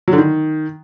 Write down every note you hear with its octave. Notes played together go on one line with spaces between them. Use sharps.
F#3
D3
D#3